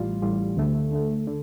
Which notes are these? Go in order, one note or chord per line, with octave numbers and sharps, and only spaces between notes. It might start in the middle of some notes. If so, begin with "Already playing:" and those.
Already playing: A1 A2 G3 F4
A1 A2 G3 F4
D2 D3 A3
D2 D3 A3
D3